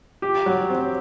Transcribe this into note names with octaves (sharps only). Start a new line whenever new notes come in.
G4
F#3
C4